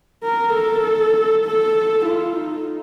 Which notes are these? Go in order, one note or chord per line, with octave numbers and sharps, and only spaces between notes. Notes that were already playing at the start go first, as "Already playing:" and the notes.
A#4
A4
A4
F4
D#4